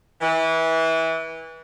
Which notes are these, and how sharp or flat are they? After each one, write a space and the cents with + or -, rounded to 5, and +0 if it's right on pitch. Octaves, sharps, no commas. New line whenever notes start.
E3 -20